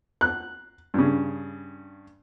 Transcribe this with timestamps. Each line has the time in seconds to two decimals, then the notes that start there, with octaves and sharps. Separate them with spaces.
0.21 F#6
0.94 G2 C#3